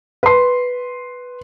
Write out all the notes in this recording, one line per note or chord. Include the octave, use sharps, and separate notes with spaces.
B4 C6